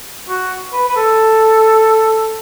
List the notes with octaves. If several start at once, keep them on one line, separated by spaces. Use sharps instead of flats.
F#4
B4
B4
A4